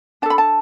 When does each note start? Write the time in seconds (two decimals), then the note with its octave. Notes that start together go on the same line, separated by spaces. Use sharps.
0.22 D4 A5
0.26 A4 B5
0.38 A5